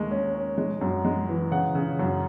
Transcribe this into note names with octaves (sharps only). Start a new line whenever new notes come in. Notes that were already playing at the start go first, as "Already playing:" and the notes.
Already playing: D#2 G#3 A#3
C#4
C#4
G#3
F#2
G#3
E3
C#3 F#5
C#3
F#2